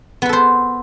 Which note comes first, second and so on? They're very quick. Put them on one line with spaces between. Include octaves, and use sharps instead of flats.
B3 B4 A4 C5